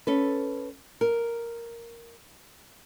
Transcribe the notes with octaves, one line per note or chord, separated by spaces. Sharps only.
C#4 A4 B4
A#4